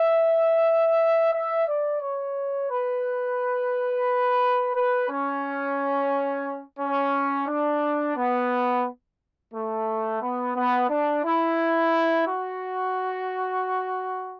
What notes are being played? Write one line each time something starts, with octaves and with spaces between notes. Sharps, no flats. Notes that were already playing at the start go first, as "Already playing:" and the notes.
Already playing: E5
E5
D5
C#5
B4
B4
C#4
C#4
D4
B3
A3
B3
B3
D4
E4
F#4